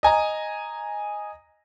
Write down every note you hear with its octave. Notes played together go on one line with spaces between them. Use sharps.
D#5 G#5 A#5